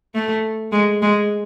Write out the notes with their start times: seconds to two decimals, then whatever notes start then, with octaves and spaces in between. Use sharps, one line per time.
0.15 A3
0.72 G#3
1.02 G#3